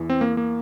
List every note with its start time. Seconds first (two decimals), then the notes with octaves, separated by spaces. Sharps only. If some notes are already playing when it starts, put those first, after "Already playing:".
Already playing: E2 E3
0.10 C4
0.21 A#3
0.37 A#3